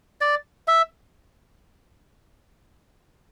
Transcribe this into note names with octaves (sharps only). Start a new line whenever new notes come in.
D5
E5